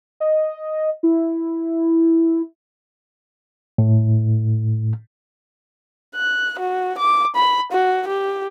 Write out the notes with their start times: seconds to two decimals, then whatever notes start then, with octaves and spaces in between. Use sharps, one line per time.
0.20 D#5
1.03 E4
3.78 A2
6.16 F#6
6.59 F#4
6.98 D6
7.36 B5
7.72 F#4
8.07 G4